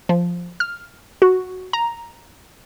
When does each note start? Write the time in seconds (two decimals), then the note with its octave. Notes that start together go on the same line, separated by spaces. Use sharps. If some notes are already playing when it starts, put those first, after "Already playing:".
0.09 F3
0.60 F6
1.22 F#4
1.73 A#5